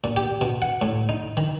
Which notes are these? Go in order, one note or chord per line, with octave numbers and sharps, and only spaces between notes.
A#2
G4
B2
F#5
A2
D#4
D#3